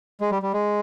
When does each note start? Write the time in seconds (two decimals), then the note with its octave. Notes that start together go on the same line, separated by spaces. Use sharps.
0.20 G#3
0.31 G3
0.42 G3
0.53 G#3